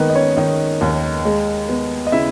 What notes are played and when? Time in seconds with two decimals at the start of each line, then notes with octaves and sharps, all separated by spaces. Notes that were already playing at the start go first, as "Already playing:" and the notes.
Already playing: D#3 G#3 A#3 B3 G#4 A#4 B4
0.10 D#5
0.15 C#4 C#5
0.37 D#3 D#4 D#5
0.81 D#2
1.25 G#3
1.69 B3
2.07 D#5
2.12 C#3 E4 E5